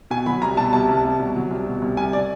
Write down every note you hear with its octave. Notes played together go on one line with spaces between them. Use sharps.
B2 G#5
F#3 B5
C2 A#5
B2 A5
C2 A5
C2
C2
B2
F#3
C2
B2
C2
C2 G#5
D5